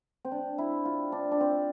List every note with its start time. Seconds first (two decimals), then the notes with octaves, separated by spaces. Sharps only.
0.25 C4
0.31 D4
0.58 E4
0.85 F4
1.12 D4
1.32 D4
1.41 C4